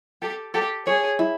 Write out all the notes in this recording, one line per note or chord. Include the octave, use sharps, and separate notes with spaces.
G4 A4
G4 A4
G#4 C#5
E4